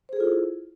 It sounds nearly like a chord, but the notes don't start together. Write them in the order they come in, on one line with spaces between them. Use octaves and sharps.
C5 G#4 A4 F4 E4